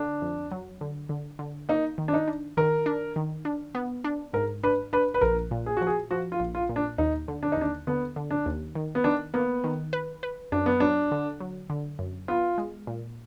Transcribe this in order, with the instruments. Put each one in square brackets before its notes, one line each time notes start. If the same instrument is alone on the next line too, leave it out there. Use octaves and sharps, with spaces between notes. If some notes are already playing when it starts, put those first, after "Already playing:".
Already playing: [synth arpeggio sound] D3 [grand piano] D4
[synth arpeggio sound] F2
F#3
D3
D3
D3
[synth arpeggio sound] A#3 [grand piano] D#4
[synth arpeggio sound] D#3
[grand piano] D4
D#4
[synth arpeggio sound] D4
[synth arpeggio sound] D#3 [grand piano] A#4
[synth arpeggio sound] D4
D#3
D4
B3
D4
[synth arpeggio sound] G#2 [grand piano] A#4
[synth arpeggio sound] D4 [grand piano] B4
[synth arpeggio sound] D4 [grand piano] B4
[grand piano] B4
[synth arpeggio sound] A#1 [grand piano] A#4
[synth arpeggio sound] A#2
[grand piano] G#4
[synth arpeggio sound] F3 [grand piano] F#4
[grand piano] G#4
[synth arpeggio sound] F3 [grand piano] F#4
[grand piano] F4
[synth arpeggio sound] A#1
[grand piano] F4
[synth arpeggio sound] A#2
[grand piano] D4
[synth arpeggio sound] D#2 [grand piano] D#4
[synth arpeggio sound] D3
[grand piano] D4
D#4
[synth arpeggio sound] D#2 [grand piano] D4
[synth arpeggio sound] D3 [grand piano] B3
[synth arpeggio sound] D3
[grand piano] D4
[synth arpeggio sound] D#2
D#3
[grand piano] B3
[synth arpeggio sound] D#3 [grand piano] D4
[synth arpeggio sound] A#3 [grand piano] B3
[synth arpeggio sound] D#3
B4
B4
[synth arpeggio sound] F#2 [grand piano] D4
[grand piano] B3
[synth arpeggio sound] F#3 [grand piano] D4
[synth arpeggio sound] D3
F#3
D3
F#2
[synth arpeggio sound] B3 [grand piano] F4
[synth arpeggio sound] G#3
A#2